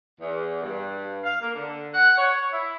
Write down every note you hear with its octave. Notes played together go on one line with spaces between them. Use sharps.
E2
G2
F5
A#3
D3
F#5
C#5
E4